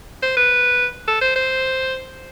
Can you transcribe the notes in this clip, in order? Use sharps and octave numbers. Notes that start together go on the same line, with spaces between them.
C5
B4
A4
C5
C5